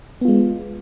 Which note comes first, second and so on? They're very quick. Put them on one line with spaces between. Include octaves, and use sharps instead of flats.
B3 F4 G#3